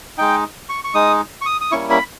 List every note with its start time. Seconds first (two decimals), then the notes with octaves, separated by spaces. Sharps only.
0.18 G#3 D#4 G5
0.69 C#6
0.84 C#6
0.94 G#3 D#4 D#6
1.41 C#6
1.46 D#6
1.61 D#6
1.71 G3 A#3 C#4 E4 C#6
1.90 B5